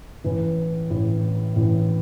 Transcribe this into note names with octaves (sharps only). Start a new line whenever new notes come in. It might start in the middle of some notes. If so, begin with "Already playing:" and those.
A1 A2 E3
A1 A2 E3
A1 A2 E3